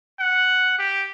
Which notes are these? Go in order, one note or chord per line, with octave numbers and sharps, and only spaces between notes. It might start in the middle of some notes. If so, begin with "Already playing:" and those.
F#5
G4